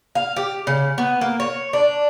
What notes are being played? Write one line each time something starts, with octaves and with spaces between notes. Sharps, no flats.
F5
G4
C#3
B3
A#3
C#5
D4